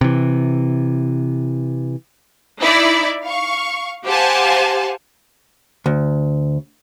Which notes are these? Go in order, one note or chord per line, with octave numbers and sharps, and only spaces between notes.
C3 E3
D#4 E4 D5
F5 C#6
G4 C5 F5 F#5 G#5 A5
D2